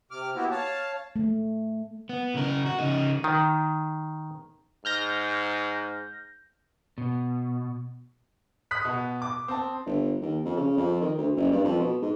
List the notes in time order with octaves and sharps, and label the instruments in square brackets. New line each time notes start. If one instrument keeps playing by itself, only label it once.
[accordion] C3 D6 F6
A#3 B3 E4 F#4 G4
C#5 F5 A5
[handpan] A3
[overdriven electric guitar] B3
C#3 A#4
F#4
C#3 D#4
[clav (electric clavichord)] D#3
[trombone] G#2 [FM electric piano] F6 G6 A#6
[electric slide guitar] B2
[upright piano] D#6 F#6 B6
B2
D6
C4 A5
[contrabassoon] G1
D#2
F2
C#3
F2
D#3
D2
F#1
G2
F2
B2
G#2